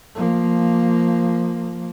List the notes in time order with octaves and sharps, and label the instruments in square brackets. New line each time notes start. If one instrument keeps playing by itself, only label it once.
[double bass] F3 A#3